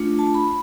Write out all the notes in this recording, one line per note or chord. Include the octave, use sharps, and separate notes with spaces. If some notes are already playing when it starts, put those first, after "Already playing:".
Already playing: A3 D4 F4
A5
B5